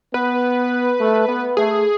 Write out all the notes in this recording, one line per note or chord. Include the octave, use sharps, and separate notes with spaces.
B3 B4
A3
B3
A3 G#4